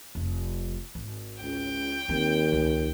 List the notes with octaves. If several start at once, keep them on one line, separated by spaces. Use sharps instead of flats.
F1
G#1
C#2 G5
D#2 C4
C#2